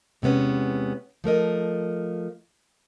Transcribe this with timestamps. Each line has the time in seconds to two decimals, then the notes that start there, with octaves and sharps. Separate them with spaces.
0.22 E2 C3 G#3 B3 C#4
1.24 F3 A3 A#4 D#5